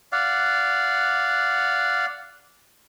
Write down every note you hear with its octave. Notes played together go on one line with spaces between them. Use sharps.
D5 F5 F#5